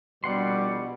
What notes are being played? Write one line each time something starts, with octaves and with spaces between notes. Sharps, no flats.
A#1 B2 G3 D5 F#5 C6